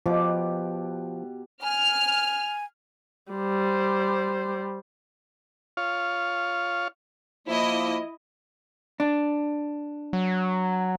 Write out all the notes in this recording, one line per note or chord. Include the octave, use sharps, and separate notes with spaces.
B2 F3 G4 D6
G#5 F6
G3 C5
F4 C#5 F5
F3 A#3 E4 D#5
D4
F#3